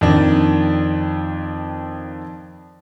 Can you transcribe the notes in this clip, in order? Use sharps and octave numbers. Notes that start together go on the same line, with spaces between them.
F2 D#3 D4